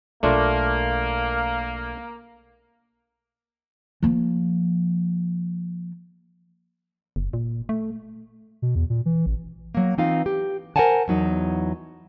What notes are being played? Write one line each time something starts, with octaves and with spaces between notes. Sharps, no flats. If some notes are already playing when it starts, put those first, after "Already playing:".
B1 A3 A#3 D4 F4
F3 A#3
F#1
A#2
A3
B2
E2
A#2
E3
A1
F#3 A#3
E3 C4 D#4 F4 F5
G4
A#4 C5 D5 F#5 G#5 A5
E2 F#3 D#4